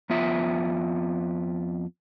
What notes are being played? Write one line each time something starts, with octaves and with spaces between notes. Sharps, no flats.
F2 B3 F4 E5